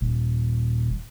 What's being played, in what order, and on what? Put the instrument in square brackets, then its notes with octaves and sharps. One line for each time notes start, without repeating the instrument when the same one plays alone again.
[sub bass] D#1